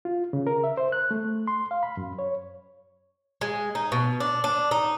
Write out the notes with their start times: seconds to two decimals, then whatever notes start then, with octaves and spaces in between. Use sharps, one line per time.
0.05 F4
0.33 C#3
0.47 A#4
0.64 E5
0.77 C5
0.92 F#6
1.11 A3
1.48 C6
1.71 F5
1.83 B5
1.97 F#2
2.19 C#5
3.41 G#3
3.75 D#4
3.92 B2
4.20 D4
4.44 D4
4.71 D#4